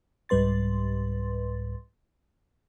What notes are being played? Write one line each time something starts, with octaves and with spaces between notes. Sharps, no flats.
C2 G#2 G3 B4 C6 A6